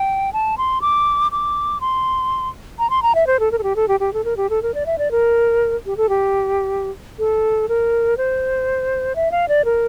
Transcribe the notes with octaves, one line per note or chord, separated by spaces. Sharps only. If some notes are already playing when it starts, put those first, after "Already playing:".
Already playing: G5
A5
C6
D6
D6
C6
A#5
C6
A#5
E5
C5
A4
A#4
A4
G4
A4
G4
G4
A4
A#4
G4
A4
A#4
D5
E5
D5
A#4
G4
A4
G4
A4
A#4
C5
E5
F5
D5
A#4